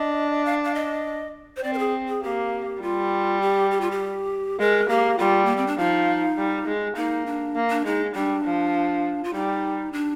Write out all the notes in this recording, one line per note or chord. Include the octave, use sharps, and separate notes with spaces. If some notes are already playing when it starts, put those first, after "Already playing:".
Already playing: D4 D#5
F5
F5
D#5
C5
C4 D5
A#4
G#4
G#4
A#3 G4
G3 F4
G4
G4
F4
G4
G#3 A#4
A#3 G4
G3 F4
A#3
C4
D4
F3 D#4
G3
G#3
A#3 D#4
D4
A#3
D4
G#3 D#4
G3 D4
F3
F4
G3 D#4
D4